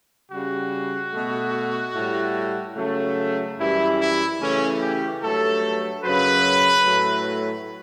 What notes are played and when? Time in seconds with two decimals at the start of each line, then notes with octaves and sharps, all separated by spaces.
0.30 C#3 G3 F#4
1.13 B2 A3
1.95 A2 G3
2.75 C#3 F#3 A3
3.58 F#2 E3 G3 E4
3.98 E4
4.40 C#3 E3 A3 C#4
4.80 G4
5.21 G2 F#3 A3 A4
6.04 F#2 C#3 F#3 B4
6.85 A2 F#3 A3